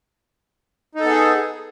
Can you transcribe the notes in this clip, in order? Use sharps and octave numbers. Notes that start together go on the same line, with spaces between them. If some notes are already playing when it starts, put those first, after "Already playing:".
B3 D#4 G#4 A4